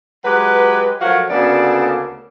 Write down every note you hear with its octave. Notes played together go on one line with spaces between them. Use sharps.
F#3 G#3 G4 B4
F3 F#3 A3 F#4 A#4 F5
D2 C#3 A#3 B3 A4 D5